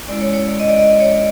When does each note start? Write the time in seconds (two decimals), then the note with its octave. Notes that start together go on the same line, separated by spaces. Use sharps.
0.08 G#3 C#4 E4 D5
0.21 C#5
0.34 C#5
0.46 D5
0.60 D#5
0.69 D5
0.78 D#5
1.00 C#5
1.11 D5